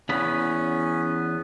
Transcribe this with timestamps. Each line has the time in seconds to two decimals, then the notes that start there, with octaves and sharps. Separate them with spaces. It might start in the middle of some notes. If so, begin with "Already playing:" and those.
0.09 E2 B3 C#4 B5